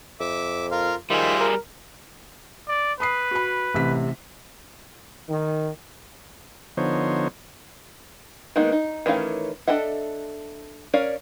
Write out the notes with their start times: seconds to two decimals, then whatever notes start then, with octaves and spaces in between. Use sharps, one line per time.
0.20 F2 E5 D6
0.71 F4 A#4 F5
1.10 D#3 G3 F4 G#4 C5 E5
1.40 A#4
2.68 D5
3.00 B4 B5 D#6 C7
3.31 F#4 B5
3.74 A1 C3 B6
5.29 D#3
6.77 D3 F3 B3 D#4 C5 C#5
8.56 D#3 G#3 A#3 B3 D#4
8.72 D#4
9.06 D#3 E3 A3 C#4 F5
9.67 D4 A4 D#5 E5 F#5
10.93 C#4 A#4 C#5 D5 F5